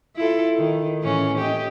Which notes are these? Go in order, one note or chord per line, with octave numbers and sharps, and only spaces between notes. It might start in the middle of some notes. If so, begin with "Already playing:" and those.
E4 F4 A4
D#3
A2 E3 C#4
G4 D#5